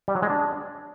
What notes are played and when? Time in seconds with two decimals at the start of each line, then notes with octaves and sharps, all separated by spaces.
0.08 G3
0.15 F#3
0.22 G#3
0.30 D4